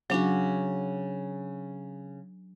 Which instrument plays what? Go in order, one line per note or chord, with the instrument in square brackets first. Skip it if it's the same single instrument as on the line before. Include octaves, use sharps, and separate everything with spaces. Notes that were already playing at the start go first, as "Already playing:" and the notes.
[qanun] C#3 C#4 F#4 [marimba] F#3 D4